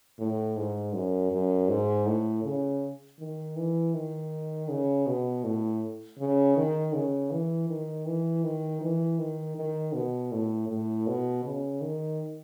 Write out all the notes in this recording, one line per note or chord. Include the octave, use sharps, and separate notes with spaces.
A2
G#2
F#2
F#2
G#2
A2
C#3
D#3
E3
D#3
C#3
B2
A2
C#3
D#3
C#3
E3
D#3
E3
D#3
E3
D#3
D#3
B2
A2
A2
B2
C#3
D#3